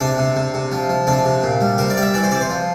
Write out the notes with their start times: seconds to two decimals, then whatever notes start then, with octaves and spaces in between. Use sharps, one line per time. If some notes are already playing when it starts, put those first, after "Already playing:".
0.01 C3 D4
0.18 C3
0.36 C3
0.54 C3
0.72 F3
0.89 F3
1.07 C3 D4
1.25 C3
1.43 A#2
1.61 G3
1.78 C3 A#4
1.90 D5
1.96 G3 F5
2.02 E5
2.14 E3 D5
2.24 C5
2.31 C3 D5
2.41 C5
2.50 F3